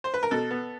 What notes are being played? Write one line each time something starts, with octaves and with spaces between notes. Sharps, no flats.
C5
B4
A#4
B2 A4
B3